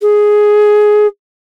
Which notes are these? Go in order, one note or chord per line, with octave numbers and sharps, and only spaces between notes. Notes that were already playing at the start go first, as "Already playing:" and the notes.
G#4